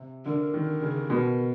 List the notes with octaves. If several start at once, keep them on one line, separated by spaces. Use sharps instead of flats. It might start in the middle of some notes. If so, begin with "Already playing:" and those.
Already playing: C3
D3 A#4
D#3
C#3
B2